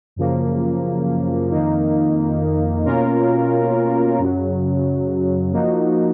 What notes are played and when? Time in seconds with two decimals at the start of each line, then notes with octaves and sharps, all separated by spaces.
0.16 F#2 C#3 F3 A#3
1.51 F2 D#3 A#3 D#4
2.85 B2 A#3 C#4 F4 A#4
4.19 F#2 C#3 F#3
5.52 F3 A#3 D#4 F#4